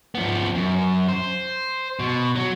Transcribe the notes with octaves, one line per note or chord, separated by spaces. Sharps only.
F3 B3
F#2
C5
B2
F#3